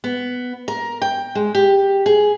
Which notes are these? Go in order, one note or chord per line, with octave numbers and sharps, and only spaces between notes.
B3
A#4
G5
G#3
G4
G#4